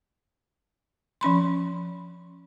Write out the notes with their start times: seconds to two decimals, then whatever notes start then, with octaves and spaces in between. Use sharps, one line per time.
1.21 F3 C#4 B5 C6